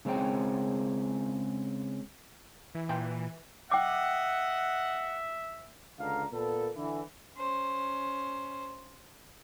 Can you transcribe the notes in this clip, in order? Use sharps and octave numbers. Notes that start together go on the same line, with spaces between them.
C#3 G#3 C4 C#4 G5
E3
A#2 G5 C6
D#5 E5 F#5 G5 D6
C#2 D3 D4 F5 A#5
A#2 A#3 B3 A4
D3 E3
C#4 C5